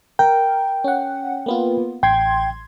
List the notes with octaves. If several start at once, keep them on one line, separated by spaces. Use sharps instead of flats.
A#4 G5
C#4 F#5
A#3 B3 F4
A1 G5 C6 G#6